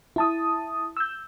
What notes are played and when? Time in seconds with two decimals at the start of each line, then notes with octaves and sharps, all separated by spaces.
0.16 E4 A5 D#6
0.97 E6 G6